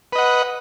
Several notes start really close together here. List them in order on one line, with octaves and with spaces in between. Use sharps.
B4 D#5 F#5